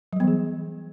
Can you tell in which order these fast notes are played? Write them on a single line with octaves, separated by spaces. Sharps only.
F#3 G3 B3 E3 G#4